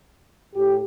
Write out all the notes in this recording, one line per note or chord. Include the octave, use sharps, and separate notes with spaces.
A2 G4